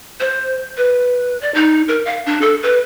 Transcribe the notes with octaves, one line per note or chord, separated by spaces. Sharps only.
C5
B4
D5
D#4
A#4
F5
D4
A4
B4